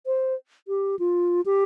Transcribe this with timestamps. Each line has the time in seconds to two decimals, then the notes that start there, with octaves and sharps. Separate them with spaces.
0.06 C5
0.68 G4
0.99 F4
1.46 G4